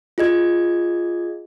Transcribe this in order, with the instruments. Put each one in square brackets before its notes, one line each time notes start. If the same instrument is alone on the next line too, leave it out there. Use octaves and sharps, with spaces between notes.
[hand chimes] F4 G#4 D#5 G#6